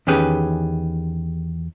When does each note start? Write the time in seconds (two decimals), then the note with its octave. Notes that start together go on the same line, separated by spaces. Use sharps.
0.07 E2 D#3 C#4 G4 G#4 B4